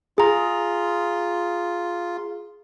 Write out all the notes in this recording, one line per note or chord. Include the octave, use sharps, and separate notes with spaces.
F4 G#4 A#5